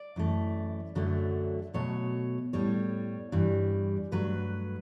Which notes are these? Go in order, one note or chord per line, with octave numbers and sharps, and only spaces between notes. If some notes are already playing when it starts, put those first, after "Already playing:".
Already playing: D5
F#2 E3 A3
F#2 D3 F#3 A3
B2 F#3 A3 C#5
A2 G3 C#5
G2 E3 G3
G2 F#3 A3 B4